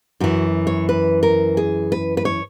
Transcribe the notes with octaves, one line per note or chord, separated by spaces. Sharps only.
F#2 E3 F#4
C#5
B4
A#4
G#4
B4
B4
C#5